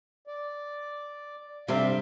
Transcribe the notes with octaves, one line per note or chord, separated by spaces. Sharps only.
D5
G2 C3 G3 C4 G4 D5 E5 F5